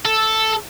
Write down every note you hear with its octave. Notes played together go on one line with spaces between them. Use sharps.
A4